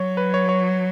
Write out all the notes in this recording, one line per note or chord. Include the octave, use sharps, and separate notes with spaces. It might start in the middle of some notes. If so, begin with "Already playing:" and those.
Already playing: F#3 C#5
B4
C#5
C#5